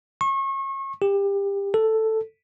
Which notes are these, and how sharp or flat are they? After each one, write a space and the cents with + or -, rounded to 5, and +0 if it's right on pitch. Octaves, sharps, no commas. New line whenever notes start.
C#6 -35
G4 +25
A4 +5